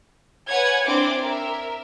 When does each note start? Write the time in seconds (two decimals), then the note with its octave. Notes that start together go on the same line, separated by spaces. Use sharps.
0.49 B4 C#5 F#5 G#5 G#6
0.87 C4 D4 E4 D6
1.19 A#4 E5